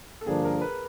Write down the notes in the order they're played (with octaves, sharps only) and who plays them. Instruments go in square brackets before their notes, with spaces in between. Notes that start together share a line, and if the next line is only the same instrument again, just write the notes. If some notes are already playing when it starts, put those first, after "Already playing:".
[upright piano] A4
[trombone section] G2 D3 F3 A#3 D4 [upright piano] G#4
[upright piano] A#4
B4